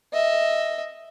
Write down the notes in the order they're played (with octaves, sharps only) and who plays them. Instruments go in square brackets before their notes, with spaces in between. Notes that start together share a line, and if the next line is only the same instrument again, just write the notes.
[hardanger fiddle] D#5 E5